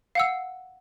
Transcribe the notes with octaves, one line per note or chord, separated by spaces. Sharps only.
F5 F#5 E6